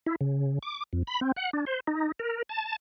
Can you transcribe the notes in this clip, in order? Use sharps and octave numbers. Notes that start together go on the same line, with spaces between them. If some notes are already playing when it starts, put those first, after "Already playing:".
E4
C#3
D6
F2
B5
C4
F#5
D4
C5
D#4
A#4
A5